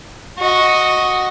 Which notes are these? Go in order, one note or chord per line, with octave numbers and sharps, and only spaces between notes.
F#4 D#5